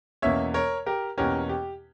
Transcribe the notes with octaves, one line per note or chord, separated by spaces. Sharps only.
E2 B2 A#3 C#4 C#5 E5
A#4 C#5
G4 A#4
E2 B2 A#3 C#4 G4 A#4
G4